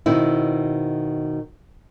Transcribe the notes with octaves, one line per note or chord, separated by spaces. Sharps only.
B2 D#3 C4 E4